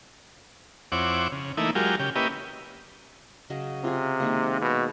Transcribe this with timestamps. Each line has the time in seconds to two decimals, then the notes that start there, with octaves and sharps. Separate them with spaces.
0.92 F2 C4 E4 C#5 F#5 D6
1.32 C#3
1.57 E3 A3 A#3 D#4 E4
1.75 F#3 G#3 F4 G4 A#4
1.99 C#3 G4
2.15 A#3 C#4 E4 G4 B4 D#5
3.50 C#3 F#3 D#5
3.84 C3 F4 G#4
4.20 D#3 G#3 A#3
4.61 B2